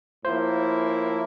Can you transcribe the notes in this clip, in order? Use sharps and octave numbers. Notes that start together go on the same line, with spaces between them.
A2 F3 A#3 E4 C5